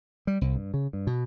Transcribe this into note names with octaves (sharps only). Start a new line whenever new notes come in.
G3
C2
G2
C#3
G2
B2